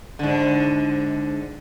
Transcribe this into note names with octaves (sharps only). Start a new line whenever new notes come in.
G#2 D3